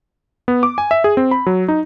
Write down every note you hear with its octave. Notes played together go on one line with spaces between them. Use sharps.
B3
D6
G#5
E5
G#4
C4
B5
F#3
D#4